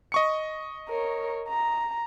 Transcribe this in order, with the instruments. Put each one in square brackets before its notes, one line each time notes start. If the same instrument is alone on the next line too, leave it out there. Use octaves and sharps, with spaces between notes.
[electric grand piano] D#5 C#6 C#7
[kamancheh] A#4 C#5
A#5